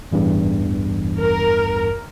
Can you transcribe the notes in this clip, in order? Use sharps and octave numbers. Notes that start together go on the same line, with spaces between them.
A1 E2 G2
A#4